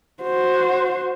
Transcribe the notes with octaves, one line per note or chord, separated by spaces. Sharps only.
F#4 C5